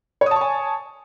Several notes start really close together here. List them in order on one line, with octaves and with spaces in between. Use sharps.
C#5 D#6 A5 C#6 G#5